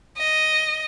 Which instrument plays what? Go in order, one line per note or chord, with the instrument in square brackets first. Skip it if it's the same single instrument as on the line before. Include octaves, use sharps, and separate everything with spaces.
[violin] D#5